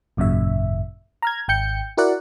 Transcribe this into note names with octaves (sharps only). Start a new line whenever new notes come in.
G#1 F#2 A#2 C#3 E5
A#5 F6 G#6
G#1 G5 G6 C#7
E4 F#4 A#4 D5 F#5